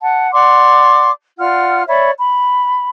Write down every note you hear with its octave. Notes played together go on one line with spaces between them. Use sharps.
F#5 A5
D5 F#5 C6 D6
F4 D5 F#5 F6
C#5 D5 E5 B5
B5